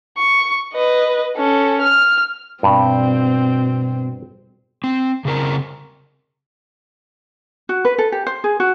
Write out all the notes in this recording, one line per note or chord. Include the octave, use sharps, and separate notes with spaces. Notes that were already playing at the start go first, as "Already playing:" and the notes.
C#6
B4 D#5
C#4 A4
F6
G2 B2 C4
C4
C#3 C4 A#4 A#5
F#4
B4
A4
G4
C5
G#4
F#4